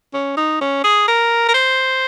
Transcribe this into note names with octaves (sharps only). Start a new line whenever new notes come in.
C#4
D#4
C#4
G#4
A#4
A#4
C5